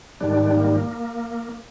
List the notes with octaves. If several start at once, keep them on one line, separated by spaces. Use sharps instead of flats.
G#2 D#3 G3 D4
A#3